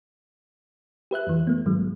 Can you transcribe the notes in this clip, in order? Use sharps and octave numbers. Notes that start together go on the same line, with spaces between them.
G4 B4 E5 F#6
F2 E3
A3 B3
G#2 D#3 F#3 G#3
C2